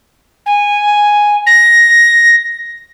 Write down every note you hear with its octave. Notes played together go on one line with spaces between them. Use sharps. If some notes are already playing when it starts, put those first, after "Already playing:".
G#5
A#6